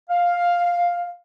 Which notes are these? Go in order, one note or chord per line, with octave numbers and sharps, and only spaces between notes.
F5